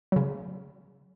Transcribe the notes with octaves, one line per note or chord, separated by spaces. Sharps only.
C#3 F#3